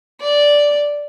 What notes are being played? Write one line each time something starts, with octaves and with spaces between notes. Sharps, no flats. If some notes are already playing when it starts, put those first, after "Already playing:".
D5